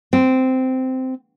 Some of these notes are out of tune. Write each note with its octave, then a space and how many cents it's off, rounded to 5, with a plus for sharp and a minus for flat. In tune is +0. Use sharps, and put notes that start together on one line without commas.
C4 -10